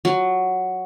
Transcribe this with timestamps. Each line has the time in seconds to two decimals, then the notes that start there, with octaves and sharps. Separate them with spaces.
0.05 F#3